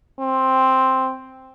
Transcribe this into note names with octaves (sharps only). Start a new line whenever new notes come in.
C4